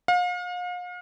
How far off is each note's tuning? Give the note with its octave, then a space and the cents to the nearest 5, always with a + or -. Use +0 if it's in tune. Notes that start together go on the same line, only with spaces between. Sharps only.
F5 +40